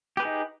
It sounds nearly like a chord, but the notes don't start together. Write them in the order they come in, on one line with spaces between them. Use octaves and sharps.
G4 B4 G#4 D#4